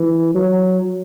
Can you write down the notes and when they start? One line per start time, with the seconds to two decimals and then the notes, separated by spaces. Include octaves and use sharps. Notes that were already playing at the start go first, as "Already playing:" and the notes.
Already playing: E3
0.35 F#3